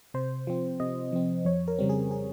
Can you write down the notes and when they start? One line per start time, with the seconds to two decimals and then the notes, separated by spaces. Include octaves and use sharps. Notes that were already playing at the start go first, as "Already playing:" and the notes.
0.14 C3 C5
0.47 F3 C4
0.80 C3 D#5
1.12 F3 C4
1.45 F2 C#5
1.68 A#4
1.79 C#3 G3 C4
1.89 G#4
2.11 G#4